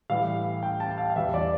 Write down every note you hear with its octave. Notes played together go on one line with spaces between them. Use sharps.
A2 E3 G3 F5
G5
A5
F5
F5
E2 E3 G3 E5
D5